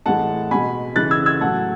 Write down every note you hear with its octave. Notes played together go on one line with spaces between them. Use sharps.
A2 E3 G#3 F#5 A5
B2 G#3 G#5 B5
C#3 E3 G#3 F#6 A6
E6 G#6
E6 G#6
A2 F#3 F#5 A5